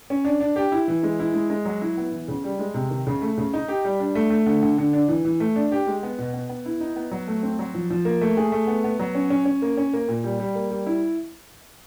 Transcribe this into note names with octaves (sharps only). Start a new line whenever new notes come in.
C#4
D4
D4
G4
E4
E3
G#3
E4
G#3
G#3
F#3
E4
B3
E3
C#3
G3
G#3
C3
D#3
C#3
A3
C#3
D#4
G4
G3
D4
A3
A3
D3
D3
D3
D4
E3
E3
A3
D4
G4
G#3
B3
B2
B3
B3
E4
D#4
B3
F#3
A3
C4
F#3
F3
F3
A#3
A3
G#4
A3
B3
B3
F#3
C#4
C#4
C#4
A#3
C#4
A#3
A#2
G3
G3
A#3
G3
E4